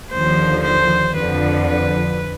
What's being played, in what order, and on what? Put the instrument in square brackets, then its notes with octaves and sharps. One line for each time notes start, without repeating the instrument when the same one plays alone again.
[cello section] D#2 D3 F3 [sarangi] C5
[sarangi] C5
[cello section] F2 D3 F3 [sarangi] B4
[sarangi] B4